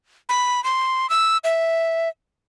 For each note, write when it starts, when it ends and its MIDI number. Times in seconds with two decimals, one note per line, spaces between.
0.29 0.63 83
0.64 1.09 84
1.10 1.38 88
1.44 2.09 76